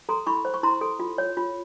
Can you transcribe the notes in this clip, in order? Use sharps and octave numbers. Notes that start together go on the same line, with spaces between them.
A4 A#5 C6
E4 B5 C#6
C5
C#6
E4 A#5 C6
A4
F4
C#5
F4